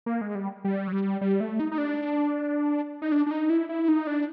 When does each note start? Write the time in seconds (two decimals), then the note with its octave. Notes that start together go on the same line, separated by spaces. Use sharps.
0.06 A#3
0.21 G#3
0.35 G3
0.64 G3
0.88 F#3
0.92 G3
1.21 G3
1.40 A3
1.60 D#4
1.72 D#4
1.78 D4
3.02 D#4
3.12 D4
3.26 D4
3.31 D#4
3.50 E4
3.69 E4
3.88 D#4
4.07 D4